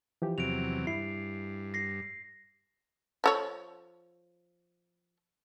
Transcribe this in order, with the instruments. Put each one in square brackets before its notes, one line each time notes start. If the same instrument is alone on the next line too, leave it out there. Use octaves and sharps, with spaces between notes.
[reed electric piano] E3 F3 G4
[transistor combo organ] E2 C3 F#3 [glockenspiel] D7 F7
[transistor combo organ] G2 [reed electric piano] E4 [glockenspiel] C7
[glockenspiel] A#6 C7
[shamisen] F3 A4 C#5